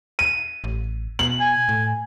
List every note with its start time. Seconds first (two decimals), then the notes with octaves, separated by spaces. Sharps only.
0.19 D#7
0.64 A1
1.19 B2 F#7
1.40 G#5
1.69 A2